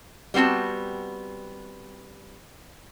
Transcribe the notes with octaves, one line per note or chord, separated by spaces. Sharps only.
G3 B3 C4 F#4 A5